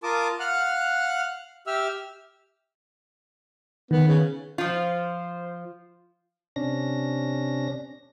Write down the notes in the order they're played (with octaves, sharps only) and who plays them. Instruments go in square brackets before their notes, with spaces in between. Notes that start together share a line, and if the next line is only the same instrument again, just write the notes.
[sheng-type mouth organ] F4 A#4 A5 D6 D#6
F5 F#5 F6 F#6
G4 E5 E6 F6
[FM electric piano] D#3 [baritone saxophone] B3
[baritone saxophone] C#3
[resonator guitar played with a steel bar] F3 F4 [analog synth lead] C5
[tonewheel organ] C3 C#4 D4 A#6